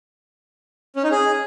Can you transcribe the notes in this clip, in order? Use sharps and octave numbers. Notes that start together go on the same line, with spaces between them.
C#4
D#4
G#4